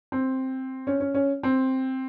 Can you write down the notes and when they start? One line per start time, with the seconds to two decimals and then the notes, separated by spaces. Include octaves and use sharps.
0.12 C4
0.87 C#4
1.00 C#4
1.14 C#4
1.43 C4